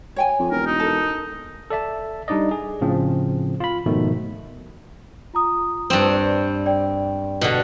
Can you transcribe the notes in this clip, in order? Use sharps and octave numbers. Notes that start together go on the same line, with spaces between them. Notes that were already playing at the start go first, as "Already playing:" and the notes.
C#5 G5 G#5
F2
E1 A#4
D#4
A4 A#4
A4 D5 E5 A5
G3 D4 D#4 D5 D#5
G#4
A2 C#3 F3 C4
F4 B5
G#2 B2 D#3 F3 A3
F4 A#5 D#6
G2 C4
D5
D5 G5
B2 D3